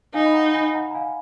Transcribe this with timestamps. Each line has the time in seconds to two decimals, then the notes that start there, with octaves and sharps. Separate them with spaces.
0.14 D#4 F5 G#5
0.26 B5
0.34 F#5 A#5
0.54 G#5 B5
0.74 F#5 A#5
0.91 A#5
0.94 F5 G#5